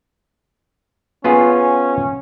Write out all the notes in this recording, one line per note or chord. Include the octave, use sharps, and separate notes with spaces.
B3 C#4 F4 G#4